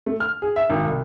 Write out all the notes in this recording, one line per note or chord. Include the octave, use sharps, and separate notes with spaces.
A3
F6
G#4
E5
G#1
C2